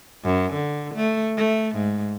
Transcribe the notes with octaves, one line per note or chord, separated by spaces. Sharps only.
F#2
D3
A3
A3
G#2